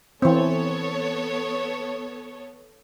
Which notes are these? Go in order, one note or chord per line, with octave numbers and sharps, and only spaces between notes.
E3 B3 C4 A4 C#5